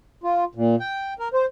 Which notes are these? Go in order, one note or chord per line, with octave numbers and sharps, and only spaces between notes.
F4
A#2
G5
A#4
C5